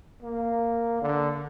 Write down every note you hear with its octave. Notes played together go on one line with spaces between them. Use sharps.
A#3
D3